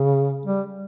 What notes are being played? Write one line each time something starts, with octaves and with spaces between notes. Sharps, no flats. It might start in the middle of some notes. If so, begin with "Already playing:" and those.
Already playing: C#3
G3